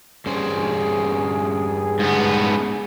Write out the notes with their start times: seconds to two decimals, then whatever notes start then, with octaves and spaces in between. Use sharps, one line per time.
0.26 G2 C#4 G#4 C5
1.99 G#2 B3